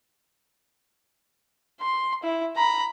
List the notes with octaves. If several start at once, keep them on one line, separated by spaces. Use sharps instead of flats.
C6
E4
A#5 B5